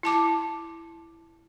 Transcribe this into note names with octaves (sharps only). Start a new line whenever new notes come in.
E4 A5 D6